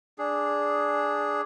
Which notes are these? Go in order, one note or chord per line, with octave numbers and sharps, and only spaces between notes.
D4 G#4